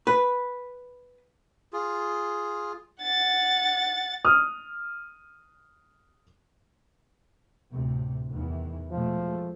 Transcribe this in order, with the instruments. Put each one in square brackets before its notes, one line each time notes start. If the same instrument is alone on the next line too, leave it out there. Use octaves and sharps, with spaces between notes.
[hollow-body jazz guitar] B4
[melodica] F4 G#4
[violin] F#5 A6
[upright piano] D#6 F6
[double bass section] D2 A2 C3
E2 D#3 E3
[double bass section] B2 G#3 A3 [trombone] F3